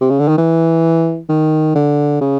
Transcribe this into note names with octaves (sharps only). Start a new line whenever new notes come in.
C3
C#3
D3
D#3
E3
D#3
D3
C#3